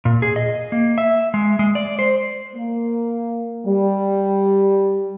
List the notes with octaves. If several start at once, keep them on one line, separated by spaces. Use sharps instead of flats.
A#2
G#4
D#5
A#3
E5
G#3
G#3
D5
C5
A#3
G3